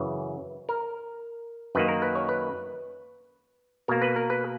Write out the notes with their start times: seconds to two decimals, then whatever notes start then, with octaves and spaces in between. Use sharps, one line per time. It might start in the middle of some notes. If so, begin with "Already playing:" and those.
Already playing: F#2 C#3 E3 B4
0.69 A#4
1.75 F#2 D#3 A#3 B4
1.88 A#4
2.02 B4
2.15 C#5
2.29 B4
3.88 B2 A#3 A#4
4.02 B4
4.16 A#4
4.30 B4